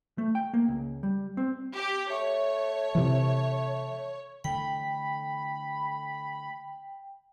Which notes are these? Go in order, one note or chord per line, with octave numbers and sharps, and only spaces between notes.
A3
G5
A#3
C#2
G3
C4
G4
A3 C#5
C3 E3
D3 E3 A3 G5 B5